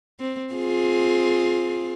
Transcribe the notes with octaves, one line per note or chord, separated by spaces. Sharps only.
C4
C4 F4 G#4